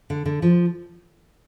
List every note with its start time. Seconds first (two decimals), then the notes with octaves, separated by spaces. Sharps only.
0.10 D3
0.26 D3
0.42 F3